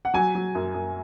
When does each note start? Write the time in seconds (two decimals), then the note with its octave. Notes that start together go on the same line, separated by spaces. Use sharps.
0.05 F#5
0.14 F#3 G#5
0.35 F#3
0.55 F#2
0.74 F#2